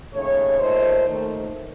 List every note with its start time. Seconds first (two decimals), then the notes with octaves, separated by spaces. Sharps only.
0.13 D#2 C#3 A3 C#5
0.59 A#2 A3 D#4 C5
1.06 D#2 D#3 A3